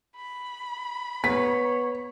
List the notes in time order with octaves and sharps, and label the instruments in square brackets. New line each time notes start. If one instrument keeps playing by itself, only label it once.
[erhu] B5
[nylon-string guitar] B3 [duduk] C#5 [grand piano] B6